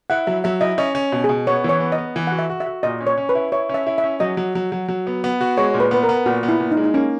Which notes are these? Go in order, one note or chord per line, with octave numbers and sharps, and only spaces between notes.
E4 F#5
F#3 E5
F#3 E5
E4 D#5
C#4 D#5
C#4
B2
B2 G#4
B3 C#5
E3 C#5
B3
D#5
B3
E3
F#4 F#5
E5
F#4
E5
F#4
A#2 D#5
C#4
C#5
C#4
B4
E4
E4 C#5
C#4 E5
E4
E5
C#4
F#3 D#5
F#3
F#3
F#3
F#3
B3
B3
F#4
G#3 C#5
A#2 C#5
B4
B3 B4
A#4
B3
A#2 F#4
B3
E4
A#2
D#4
G#3
D#4
A#3 C#4